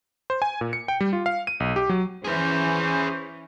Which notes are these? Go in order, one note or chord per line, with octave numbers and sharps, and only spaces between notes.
C5
G#5
A#2
C#7
G5
G3
F4
F5
D#7
B1
G4
F#3
E3 C#4 G#4 B4 C5